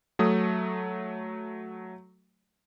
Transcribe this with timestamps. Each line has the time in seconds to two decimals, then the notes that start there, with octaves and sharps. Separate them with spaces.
0.19 F#3 A3 D#6